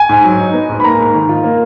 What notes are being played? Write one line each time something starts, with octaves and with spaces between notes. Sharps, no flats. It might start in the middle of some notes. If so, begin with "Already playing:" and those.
Already playing: G#5
G#2
F#3
D#4
B3
G#2
B5
A#3 A#5
G#2
D#3
F4
A#3